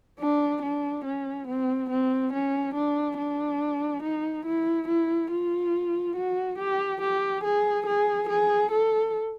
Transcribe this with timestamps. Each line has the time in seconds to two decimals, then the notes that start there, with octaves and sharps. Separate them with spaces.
0.20 D4
0.63 D4
1.05 C#4
1.48 C4
1.90 C4
2.33 C#4
2.75 D4
3.18 D4
4.03 D#4
4.46 E4
4.88 E4
5.31 F4
6.16 F#4
6.59 G4
7.02 G4
7.44 G#4
7.87 G#4
8.29 G#4
8.72 A4